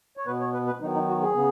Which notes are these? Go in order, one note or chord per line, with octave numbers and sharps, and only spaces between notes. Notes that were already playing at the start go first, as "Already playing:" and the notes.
C#5
B2 B3 B4
C#5
B4
B4
D#3 F#3 B3 D#4
D#4
F#4
G#4
C#3 B3